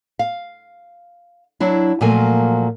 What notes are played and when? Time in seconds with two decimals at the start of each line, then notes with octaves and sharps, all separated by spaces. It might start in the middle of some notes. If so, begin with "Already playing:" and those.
0.19 F5
1.60 F#3 D4 E4
2.01 A#2 F3 F#3 A3 A#3 G#5